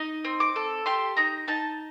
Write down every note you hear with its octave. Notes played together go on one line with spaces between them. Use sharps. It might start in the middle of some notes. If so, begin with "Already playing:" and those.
Already playing: D#4 D#5
C4
D6
A4
G4 C6
D#4 A#5
D#4 A5